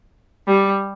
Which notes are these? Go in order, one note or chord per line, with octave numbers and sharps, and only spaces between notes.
G3